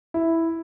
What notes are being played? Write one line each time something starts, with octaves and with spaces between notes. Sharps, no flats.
E4